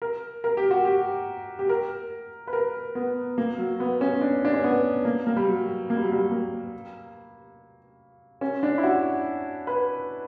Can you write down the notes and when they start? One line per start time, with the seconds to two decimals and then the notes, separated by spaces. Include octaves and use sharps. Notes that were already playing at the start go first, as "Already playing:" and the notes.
0.02 A#4
0.44 A#4
0.57 G4
0.71 F#4
0.85 G4
1.59 G4
1.69 A#4
2.47 B4
2.53 A#4
2.95 B3
3.38 A#3
3.58 F#3
3.80 B3
4.01 C#4
4.21 D4
4.45 D4
4.54 C#4
4.64 B3
5.05 A#3
5.27 A#3
5.36 G3
5.48 F#3
5.90 A#3
5.97 G3
6.05 F#3
6.12 G3
6.31 A#3
8.41 C#4
8.63 D4
8.78 E4
8.83 F#4
9.67 B4